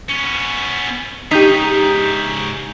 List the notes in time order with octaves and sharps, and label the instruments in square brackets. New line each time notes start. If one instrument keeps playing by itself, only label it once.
[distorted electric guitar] B3 C#4
[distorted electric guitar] G#2 C#3 [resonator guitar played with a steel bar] D#4 [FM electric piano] G4 G6 B6